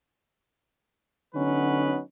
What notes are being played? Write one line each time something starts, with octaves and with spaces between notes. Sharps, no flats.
D3 F#3 B3 C#4 D#4 B4